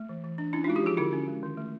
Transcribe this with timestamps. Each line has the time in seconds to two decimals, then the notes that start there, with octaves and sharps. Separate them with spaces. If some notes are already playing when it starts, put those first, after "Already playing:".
Already playing: A3
0.09 E3
0.24 E3
0.38 D4
0.53 C#4 D4 E4
0.64 D#4 F4
0.68 G#3 F#4
0.75 F4 G4
0.83 F3 F#4 G#4
0.97 D3 E4 F#4
1.13 C#4
1.28 G#3
1.43 D#3
1.57 A3